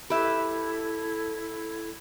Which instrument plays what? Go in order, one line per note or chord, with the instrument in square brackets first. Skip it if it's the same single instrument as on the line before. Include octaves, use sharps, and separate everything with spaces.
[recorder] E4 [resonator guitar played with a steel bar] G4 E5 [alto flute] A4 [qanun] B4